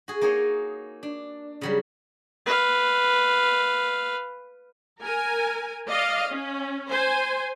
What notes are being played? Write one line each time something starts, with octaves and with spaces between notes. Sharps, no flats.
F#4 G#4
A#3 D#4 G#4 C#5 D#5
D4
C#3 F#3 G3
B4 F5
A#4 G#5
D5 D#5 F5
C#4
C5 G#5